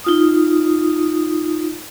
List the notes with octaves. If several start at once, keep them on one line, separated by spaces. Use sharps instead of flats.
D#4 F4 D#6